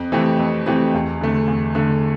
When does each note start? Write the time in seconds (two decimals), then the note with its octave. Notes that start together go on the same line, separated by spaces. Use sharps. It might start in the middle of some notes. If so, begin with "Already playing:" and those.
Already playing: F2
0.12 E3 A3 C4 G4
0.39 F2
0.66 E3 A3 C4 G4
0.94 E2
1.21 D3 A3
1.48 E2
1.75 D3 A3